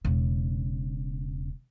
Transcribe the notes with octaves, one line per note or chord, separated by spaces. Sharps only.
E1 C#3